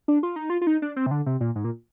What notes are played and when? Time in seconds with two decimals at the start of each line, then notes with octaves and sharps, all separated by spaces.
0.08 D4
0.23 F4
0.36 D#4
0.50 F4
0.61 F4
0.67 D#4
0.82 D4
0.96 C4
1.06 C3
1.11 D3
1.26 C3
1.40 A#2
1.56 G#2
1.64 A#2